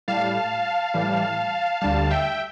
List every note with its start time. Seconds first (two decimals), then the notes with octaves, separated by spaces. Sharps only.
0.08 A2 G3 F5 A5
0.94 A2 E3 G3
1.81 D2 D3 G3 F5 A5
2.11 E5 G5